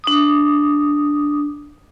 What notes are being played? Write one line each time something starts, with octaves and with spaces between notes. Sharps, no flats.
D4 D6 D#6